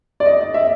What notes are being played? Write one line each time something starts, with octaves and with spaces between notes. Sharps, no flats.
D5
D#5
D#5
E5